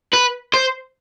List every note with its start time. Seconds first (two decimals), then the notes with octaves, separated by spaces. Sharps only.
0.13 B4
0.53 C5